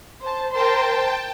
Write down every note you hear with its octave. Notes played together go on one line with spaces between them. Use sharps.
C5 A5
A#4 C5 G5 A5 C6